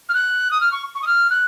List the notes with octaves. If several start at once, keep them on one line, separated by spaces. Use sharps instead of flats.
F6
F#6
D#6
F6
C#6
C#6
D#6
F6
F#6